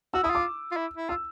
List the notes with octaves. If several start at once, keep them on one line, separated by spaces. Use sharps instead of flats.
F#4 E6
E4 D#6
F4 D6
F4
E4
E4
F4 E6